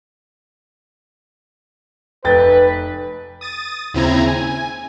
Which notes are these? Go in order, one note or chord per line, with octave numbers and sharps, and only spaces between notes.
F1 B4 G5 A6
D#6 A6 D#7
D#2 C#3 C4 E4 A#5 G#6
G#5